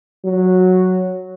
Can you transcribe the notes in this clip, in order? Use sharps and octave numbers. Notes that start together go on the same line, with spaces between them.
F#3